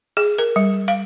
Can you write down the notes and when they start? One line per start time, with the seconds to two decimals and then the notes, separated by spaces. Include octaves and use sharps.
0.17 G#4
0.38 A#4
0.56 G3
0.88 F5